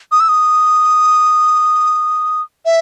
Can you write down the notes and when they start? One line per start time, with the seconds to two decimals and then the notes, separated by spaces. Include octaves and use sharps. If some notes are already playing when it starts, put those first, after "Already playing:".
0.12 D#6
0.20 E6
0.29 D#6
2.65 E5